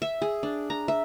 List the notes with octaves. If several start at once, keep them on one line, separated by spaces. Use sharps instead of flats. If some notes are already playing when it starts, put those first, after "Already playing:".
E5
G#4
D4
A#5
E5